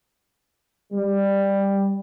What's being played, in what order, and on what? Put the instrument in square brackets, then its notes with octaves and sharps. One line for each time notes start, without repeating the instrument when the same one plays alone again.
[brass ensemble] G3